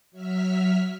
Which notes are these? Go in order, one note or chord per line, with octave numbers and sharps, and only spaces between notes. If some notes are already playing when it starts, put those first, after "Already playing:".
F#3 E5 F6 B6